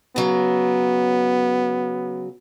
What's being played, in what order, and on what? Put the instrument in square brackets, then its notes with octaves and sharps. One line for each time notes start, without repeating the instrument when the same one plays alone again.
[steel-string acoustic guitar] C#3 F#3 [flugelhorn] B3